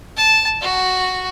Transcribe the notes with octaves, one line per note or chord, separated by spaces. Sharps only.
A5
F#4